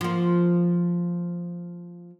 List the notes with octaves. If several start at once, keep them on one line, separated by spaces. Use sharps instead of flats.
F3 A#3